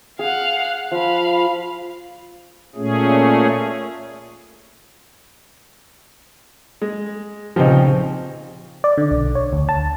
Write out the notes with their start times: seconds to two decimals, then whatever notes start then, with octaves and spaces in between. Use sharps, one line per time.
0.19 G#4 F5 F#5
0.91 F3 F5 B5
2.76 A#2 A3 C#4 G#4
6.82 G#3
7.56 A#1 C#3 F3 C4 D#4 G4
8.84 D5
8.98 D3
9.11 B1
9.35 C#5
9.53 D2
9.69 A5